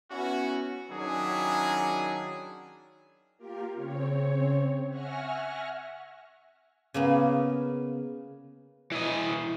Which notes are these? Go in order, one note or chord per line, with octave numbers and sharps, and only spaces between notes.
B3 C#4 E4 F#4
D#3 F#3 C#4 D4 E4 G#4
A#3 F4 G4 A#4
C#3 C4 C#5
E5 F#5 G#5 C#6 F6 A#6
C#3 A#3 B3
E3 D#5